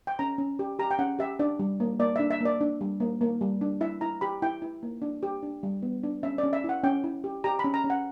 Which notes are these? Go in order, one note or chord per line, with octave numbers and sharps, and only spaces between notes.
G5
C#4 A#5
C#4
G4
G4 A#5
G5
C#4 F#5
G4 E5
D4 D5
G3
A#3
A#3 D5
D4 E5
E5
A#3 D5
D4
G3
A#3
A#3
G3
D4
E4 E5
E4 A#5
G4 B5
E4 G5
E4
A#3
D4
G4
D4
G3
B3
D4
C#4 E5
D5
C#4
E5
E4
F#5
C#4 G5
E4
G4
G4 A#5
B5
C#4
A#5
C#4
F#5